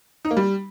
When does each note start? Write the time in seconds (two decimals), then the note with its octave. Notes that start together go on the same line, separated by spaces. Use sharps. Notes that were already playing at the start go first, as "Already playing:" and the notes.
0.25 D#4
0.31 A#3
0.37 G3